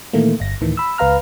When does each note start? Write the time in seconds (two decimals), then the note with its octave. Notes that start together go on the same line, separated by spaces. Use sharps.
0.13 A#2 D#3 E3 A3 A#3
0.40 G1 A#6
0.61 D2 A2 D#3 E3
0.77 B5 E6
0.98 C#2 B4 F5 A#5 F6